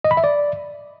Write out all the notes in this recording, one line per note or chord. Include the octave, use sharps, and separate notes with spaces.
D#5
B5
E5
D5